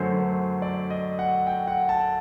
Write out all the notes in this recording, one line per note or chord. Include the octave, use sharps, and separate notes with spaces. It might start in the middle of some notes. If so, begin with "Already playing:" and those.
Already playing: F#2 D3 F#3 A3 C5
C5
D5
D#5
F#5
G5
F#5
A5